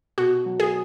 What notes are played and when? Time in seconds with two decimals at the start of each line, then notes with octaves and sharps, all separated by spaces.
0.18 B2 F#4
0.46 F#3
0.60 G#4